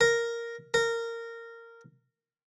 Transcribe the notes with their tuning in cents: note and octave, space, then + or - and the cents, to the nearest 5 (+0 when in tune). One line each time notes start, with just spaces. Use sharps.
A#4 +0
A#4 -15